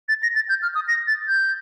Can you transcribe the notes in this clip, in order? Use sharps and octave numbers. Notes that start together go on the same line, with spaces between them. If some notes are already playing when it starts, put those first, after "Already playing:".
A6
A#6
A6
G6
F6
D#6
A#6
A6
G6